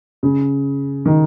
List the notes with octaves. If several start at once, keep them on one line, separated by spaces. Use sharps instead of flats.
C#3
D#3